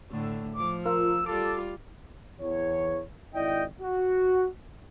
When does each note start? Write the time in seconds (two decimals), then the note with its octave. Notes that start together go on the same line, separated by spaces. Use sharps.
0.11 A2 D3 A3
0.56 F3 D6
0.86 F4 A#4 E6
1.26 G3 F4 A4 D6
2.40 E2 C#5
3.35 G#1 E4 D5 D#5 G5
3.81 F#4